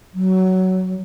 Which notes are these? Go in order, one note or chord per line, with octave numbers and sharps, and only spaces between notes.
F#3